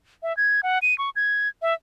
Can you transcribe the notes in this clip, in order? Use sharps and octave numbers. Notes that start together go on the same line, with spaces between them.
E5
G#6
F#5
D#7
C#6
G#6
E5